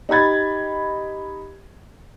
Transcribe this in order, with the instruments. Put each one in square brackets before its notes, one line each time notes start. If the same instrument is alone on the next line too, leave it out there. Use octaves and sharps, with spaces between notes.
[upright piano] D#4 G4 B5 G#6 A6